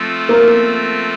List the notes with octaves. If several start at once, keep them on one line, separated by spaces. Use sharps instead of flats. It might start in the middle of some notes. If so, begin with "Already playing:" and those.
Already playing: F3 A3 C4 F4 A4
A#3